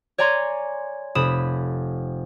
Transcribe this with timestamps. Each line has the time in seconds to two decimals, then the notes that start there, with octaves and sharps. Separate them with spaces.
0.18 C#5 D5 G#5 A#5 C6 G#6
1.15 F1 B5 D#6 E7